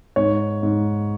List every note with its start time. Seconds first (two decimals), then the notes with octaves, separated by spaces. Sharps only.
0.16 G#2 C#5
0.63 G#2